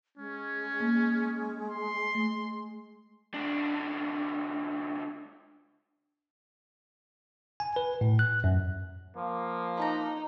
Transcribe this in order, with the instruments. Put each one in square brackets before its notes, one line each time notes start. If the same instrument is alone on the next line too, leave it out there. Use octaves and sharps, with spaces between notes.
[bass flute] G#3 [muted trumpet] C#4
[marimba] A#3
[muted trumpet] C6
[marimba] A3
[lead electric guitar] C#2 D4
[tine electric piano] G#5
B4
A2
F#6
F#2
[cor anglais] F3 [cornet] A#3
[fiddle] D#4 [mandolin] B4 A5 A#5